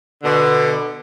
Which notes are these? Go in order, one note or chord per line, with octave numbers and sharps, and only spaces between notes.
B2 D3